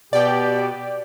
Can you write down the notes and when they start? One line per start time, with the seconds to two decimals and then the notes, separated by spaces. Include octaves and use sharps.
0.13 B2 G4 D5 G5